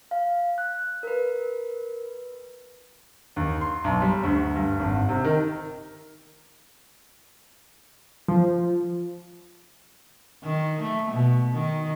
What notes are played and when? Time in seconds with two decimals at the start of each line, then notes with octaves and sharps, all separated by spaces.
0.11 F5
0.58 F#6
1.03 A#4 B4
3.36 D#2
3.61 C6
3.84 B1
4.02 G3
4.23 D2
4.55 G2
4.80 G#1
5.09 C3
5.24 D#3
8.28 F3
10.44 D#3
10.82 A3
11.11 B2
11.53 D#3